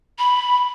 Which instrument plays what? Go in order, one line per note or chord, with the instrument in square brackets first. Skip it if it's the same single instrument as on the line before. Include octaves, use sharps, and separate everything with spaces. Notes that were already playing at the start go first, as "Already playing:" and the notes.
[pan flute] B5